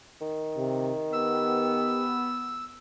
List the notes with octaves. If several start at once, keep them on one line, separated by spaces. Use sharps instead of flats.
D#3
C3
B3 G4 E6